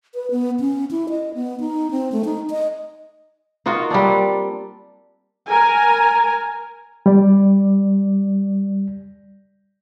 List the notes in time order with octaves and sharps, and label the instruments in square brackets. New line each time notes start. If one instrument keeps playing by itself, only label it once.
[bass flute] B4
B3
C#4
E4
D#5
B3
D#4
C4
A3
D#4
D#5
[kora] A#3 D#4 F4 F#4
G3 A#3 C4 D4
[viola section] A#4 G#5 A#5
[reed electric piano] G3 D5